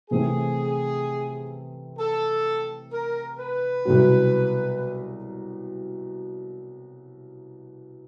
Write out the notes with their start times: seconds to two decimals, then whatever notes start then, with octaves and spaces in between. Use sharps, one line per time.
0.11 C3 E3 A3 C4 G#4
1.99 A4
2.92 A#4
3.38 B4
3.85 C2 B2 F#3